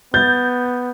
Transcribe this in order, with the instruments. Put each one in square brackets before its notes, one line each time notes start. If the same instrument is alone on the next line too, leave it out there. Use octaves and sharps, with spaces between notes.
[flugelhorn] B3 [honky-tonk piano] G6 A6